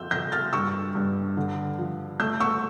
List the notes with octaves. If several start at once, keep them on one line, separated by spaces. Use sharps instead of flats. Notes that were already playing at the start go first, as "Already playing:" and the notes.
Already playing: F2 E6 G6
F2 G6 A#6
F6 A6
G2 C#6 E6
G2
D3
F3
A3 E6 G6
C#6 E6